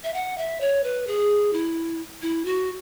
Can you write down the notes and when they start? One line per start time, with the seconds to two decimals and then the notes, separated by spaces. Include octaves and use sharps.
0.04 E5
0.14 F#5
0.38 E5
0.61 C#5
0.84 B4
1.07 G#4
1.53 E4
2.22 E4
2.45 F#4